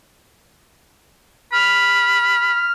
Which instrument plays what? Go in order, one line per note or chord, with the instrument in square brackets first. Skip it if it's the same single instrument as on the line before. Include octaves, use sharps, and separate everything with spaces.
[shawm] B5 [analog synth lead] F6